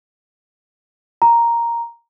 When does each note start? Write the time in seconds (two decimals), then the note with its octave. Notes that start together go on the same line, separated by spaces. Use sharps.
1.22 A#5